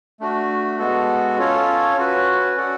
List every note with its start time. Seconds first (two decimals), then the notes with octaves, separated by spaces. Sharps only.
0.20 A3 D4 F#4
0.78 G#3 B3 F#4 A4
1.38 C#4 F4 A4 C#5
1.97 C#4 F#4 B4
2.56 C#4 F#4 A4 D5 F#5